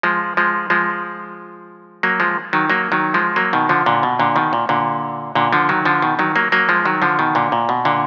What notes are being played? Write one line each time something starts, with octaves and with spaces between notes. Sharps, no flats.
F3 G#3
F3 G#3
F3 G#3
F#3 A#3
F3 G#3
D#3 F#3
F#3 A#3
D#3 F#3
F3 G#3
F#3 A#3
B2 D#3
D3 F3
A#2 D3
B2
A#2 D3
B2 D#3
A#2
A#2 D3
A#2 D3
D3 F3
D#3 F#3
D3 F3
B2 D#3
D#3 F#3
F#3 A#3
F#3 A#3
F3 G#3
D#3 F#3
D3 F3
B2 D#3
A#2 D3
A#2
B2
A#2 D3